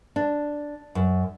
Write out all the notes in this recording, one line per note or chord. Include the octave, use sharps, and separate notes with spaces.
D4
F#2